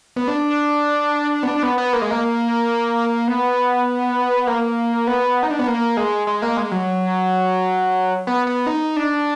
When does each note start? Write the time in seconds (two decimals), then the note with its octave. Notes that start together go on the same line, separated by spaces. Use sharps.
0.16 B3
0.28 D4
1.43 B3
1.48 D4
1.63 B3
1.78 B3
1.93 A#3
2.02 G#3
2.11 A#3
3.28 B3
4.47 A#3
5.07 B3
5.43 D#4
5.51 D4
5.59 B3
5.67 A#3
5.97 G#3
6.27 G#3
6.42 A#3
6.57 G#3
6.72 F#3
8.27 B3
8.47 B3
8.67 D#4
8.96 D4